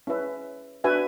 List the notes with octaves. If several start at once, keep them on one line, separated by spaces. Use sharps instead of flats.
C#4 E4 G#4 B4 E5
D4 F#4 B4 E5 G#5